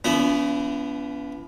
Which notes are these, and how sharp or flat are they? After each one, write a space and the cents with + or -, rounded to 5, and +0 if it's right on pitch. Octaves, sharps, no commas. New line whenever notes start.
E3 +45 B3 +0 D4 -45